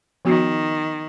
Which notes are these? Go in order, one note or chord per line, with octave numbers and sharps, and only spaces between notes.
D#3 F3 B3 F#4